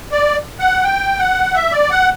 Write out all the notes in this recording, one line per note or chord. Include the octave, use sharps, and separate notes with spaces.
D5
F#5
G5
F#5
E5
D5
F#5